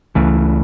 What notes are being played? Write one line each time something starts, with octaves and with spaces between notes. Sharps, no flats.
C#2 C#3 E3 A3